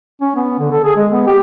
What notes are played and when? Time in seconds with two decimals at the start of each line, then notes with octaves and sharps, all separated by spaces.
0.21 C#4
0.36 B3
0.59 D3
0.72 A4
0.84 G#4
0.97 G#3
1.11 B3
1.27 G4